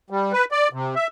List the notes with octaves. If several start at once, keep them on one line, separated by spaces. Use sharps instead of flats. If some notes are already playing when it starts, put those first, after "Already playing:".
G3
B4
D5
C3
E5